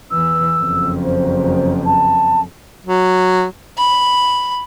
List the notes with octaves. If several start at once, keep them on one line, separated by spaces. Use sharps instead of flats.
E2 E3 E6
F#1 F2
C5
A5
F#3
B5